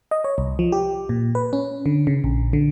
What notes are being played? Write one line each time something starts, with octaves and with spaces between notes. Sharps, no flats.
D#5
C#5
C2
F3
G4
A#2
B4
C#4
D3
C#3
A#1
D3